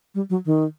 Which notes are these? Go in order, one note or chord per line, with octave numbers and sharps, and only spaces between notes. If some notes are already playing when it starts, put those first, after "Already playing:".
G3
F#3
D#3